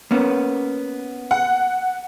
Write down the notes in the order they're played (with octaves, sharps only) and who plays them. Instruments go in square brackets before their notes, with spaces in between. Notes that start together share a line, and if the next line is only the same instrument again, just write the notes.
[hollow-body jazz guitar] A#3 B3 C#4
[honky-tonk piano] F#5